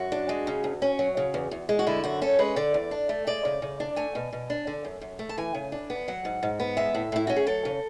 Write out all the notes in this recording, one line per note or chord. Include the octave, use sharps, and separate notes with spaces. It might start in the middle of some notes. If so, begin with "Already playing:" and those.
Already playing: F#2 F#4
D4
G#3
C#3
D2
C#4
F#3
C#3
E2
E2
G#3
F#4
D3 E4
F#2 F#4
C#4 A4
G#3 B4
D3 D5
E2
D4
A3
G#3 D5
C#3
C#3
D4
A3 G#5
B2
B2
D4
D3
F#2
F#2
A3
A5
E3 G#5
C#3
D4
B3
F#3 F#5
G#2
G#2
B3
G#3 E5
A2
A2 E4
C#4 F#4
G#4
F#3 A4
C#3